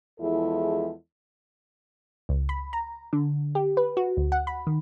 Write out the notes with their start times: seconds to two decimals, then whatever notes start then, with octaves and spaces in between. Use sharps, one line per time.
0.20 E2 F3 G#3 E4 A4
2.29 C#2
2.49 B5
2.73 A#5
3.13 D3
3.55 G4
3.77 B4
3.97 F#4
4.17 D2
4.32 F#5
4.47 B5
4.67 D#3